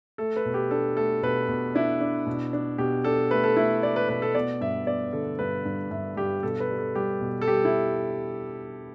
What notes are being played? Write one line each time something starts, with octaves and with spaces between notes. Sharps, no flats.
A3 A4
B4
B2
G4
D4 A4
A3 A4
B2 B4
B2
D4 E4
D4
B2
D4
B2 G4
D4 A4
A3 B4
A4
A3 E4
A3 D5
B4
B2 B4
A4
B3 D5
G2 E5
B3 D5
D3 A4
G2 B4
G2
G2 E5
G2 G4
B2 A4
B4
G3
A4
G3 G4
B2
A4
G3 G4
E4